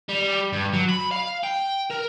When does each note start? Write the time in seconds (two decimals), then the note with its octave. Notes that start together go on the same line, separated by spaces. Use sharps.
0.09 G3
0.53 G2
0.73 F#3
0.89 B5
1.11 F5
1.44 G5
1.90 A#4